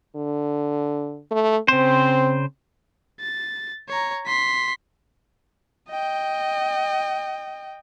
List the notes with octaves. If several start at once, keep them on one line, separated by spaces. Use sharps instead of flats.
D3
A3
C#3 C4 C5
A6
C#5 A#5
C6 B6
D#5 G5